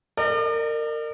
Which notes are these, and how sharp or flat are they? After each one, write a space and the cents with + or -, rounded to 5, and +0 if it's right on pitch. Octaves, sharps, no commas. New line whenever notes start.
A#4 -25 D5 +45